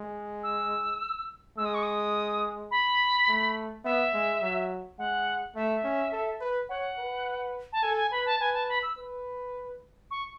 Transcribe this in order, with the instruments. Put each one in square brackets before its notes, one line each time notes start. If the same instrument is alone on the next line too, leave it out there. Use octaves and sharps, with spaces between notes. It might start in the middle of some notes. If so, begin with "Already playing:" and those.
Already playing: [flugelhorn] G#3
[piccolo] E6
[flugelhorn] G#3 [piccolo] E6
[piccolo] D#6
C#6
D#6
B5
[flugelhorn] A3
[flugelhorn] B3 [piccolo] E5
[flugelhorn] G#3
F#3
[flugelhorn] G#3 [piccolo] F#5
[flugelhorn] A3 [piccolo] E5
[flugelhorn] C#4
A4
B4
[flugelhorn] C#5 [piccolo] F#5
[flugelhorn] B4
[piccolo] A5
[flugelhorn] A4 [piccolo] G#5
[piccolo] G#5
[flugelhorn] B4 [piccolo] B5
[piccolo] A5
[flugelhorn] B4 [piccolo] G#5
[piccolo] A5
B5
E6
[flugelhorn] B4
[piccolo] C#6